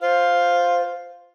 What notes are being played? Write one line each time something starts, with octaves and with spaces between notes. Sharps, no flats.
F4 C5 F5